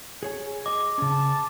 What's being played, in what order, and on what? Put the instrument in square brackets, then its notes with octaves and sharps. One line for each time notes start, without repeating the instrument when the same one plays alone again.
[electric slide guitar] G#4 C#5 G#5
[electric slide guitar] G#4 D#5 [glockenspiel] D6
[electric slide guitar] C#3 C#4 [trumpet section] A5